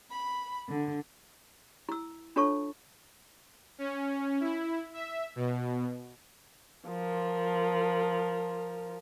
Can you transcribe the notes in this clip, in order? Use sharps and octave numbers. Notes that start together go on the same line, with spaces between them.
B5
D3
E4 E6
D4 F4 A4 C#5 A5 C#6
C#4
E4
E5
B2
F3 A#4